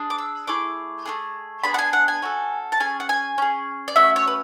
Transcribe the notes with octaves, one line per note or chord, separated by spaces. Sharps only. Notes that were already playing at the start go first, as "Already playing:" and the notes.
Already playing: D4 G#4
D6
E6
A3 E4 G#4 D6
A3 D4 G#4
B3 D4 G#4 B5
F#5
G#5
F#5
G#5
C#4 F#4 A4
A5
C#4 G#4 G#5
F#5
G#5
C#4 G#4
D5
A3 C#4 F#4 E5
C#5
B4